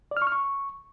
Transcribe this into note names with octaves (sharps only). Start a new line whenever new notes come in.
D5
F6
C#6
F6
C#6